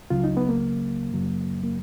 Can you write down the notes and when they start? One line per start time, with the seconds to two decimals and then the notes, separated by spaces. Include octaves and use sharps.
0.10 C#2 C#3 F#3 F4
0.24 D#4
0.37 B3
0.49 A#3
1.12 F#2 C#3 F#3
1.63 A#3